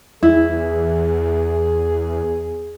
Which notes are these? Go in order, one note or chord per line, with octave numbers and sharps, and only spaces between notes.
E2 E4 G#4